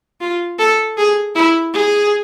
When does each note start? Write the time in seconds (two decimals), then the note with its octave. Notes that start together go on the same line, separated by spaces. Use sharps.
0.21 F4
0.59 A4
0.97 G#4
1.35 E4
1.74 G#4